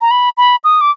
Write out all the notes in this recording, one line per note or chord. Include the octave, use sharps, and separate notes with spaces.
A#5
B5
B5
D#6
D6